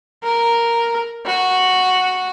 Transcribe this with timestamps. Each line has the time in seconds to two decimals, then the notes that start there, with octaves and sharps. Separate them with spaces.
0.24 A#4
1.26 F#4